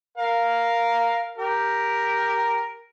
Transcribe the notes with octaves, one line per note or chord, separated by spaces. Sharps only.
A#4 F5
G4 A#4